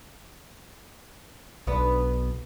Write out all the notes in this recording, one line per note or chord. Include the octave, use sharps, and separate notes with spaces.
B1 B3 D4 B4